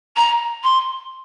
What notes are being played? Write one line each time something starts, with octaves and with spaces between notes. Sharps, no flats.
A#5
C6